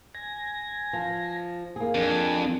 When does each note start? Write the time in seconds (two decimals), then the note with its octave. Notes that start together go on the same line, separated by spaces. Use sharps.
0.15 G#5 A#6
0.93 F3
1.76 A#3 G#4
1.95 F2 D4 G#5